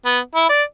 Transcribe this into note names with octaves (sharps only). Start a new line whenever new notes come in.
B3
E4
D5